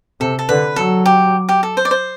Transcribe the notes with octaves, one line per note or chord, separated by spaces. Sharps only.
C3 A4
A4
D3 B4
F#3 A4
G4
G4
A4
C5
D5
C5